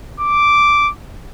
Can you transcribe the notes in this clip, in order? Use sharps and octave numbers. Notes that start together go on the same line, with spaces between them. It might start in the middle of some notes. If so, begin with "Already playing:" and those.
D6